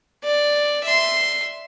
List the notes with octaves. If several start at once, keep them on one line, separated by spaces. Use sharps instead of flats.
D5
E5 C6